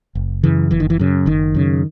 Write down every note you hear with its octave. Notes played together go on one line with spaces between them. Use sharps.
F#1
F#2 C#3 E3
F#1 E3
D#3
E3
F#2 C#3
F#1 D#3
F#2 C#3